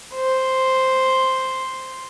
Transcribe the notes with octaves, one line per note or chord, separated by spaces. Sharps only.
C5